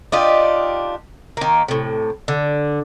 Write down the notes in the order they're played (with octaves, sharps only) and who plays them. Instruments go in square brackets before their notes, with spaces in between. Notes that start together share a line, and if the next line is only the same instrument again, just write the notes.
[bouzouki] D4 D#4 F4 G4
D#3 A#3
A2 C3
D3